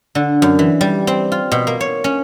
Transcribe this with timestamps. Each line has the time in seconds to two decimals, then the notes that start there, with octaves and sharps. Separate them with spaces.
0.15 D3
0.42 F#2
0.59 E3
0.81 G3
1.07 C4
1.32 F4
1.52 B2
1.67 A#3
1.81 C#5
2.04 C#4